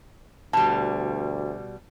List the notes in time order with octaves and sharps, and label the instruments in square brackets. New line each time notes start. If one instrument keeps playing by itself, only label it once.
[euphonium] D2 [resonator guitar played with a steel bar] B2 G3 [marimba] A5